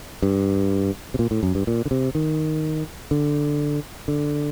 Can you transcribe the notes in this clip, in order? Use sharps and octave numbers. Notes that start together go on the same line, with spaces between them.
G2
C3
A#2
A2
F#2
G2
A#2
D3
C3
D#3
D3
D3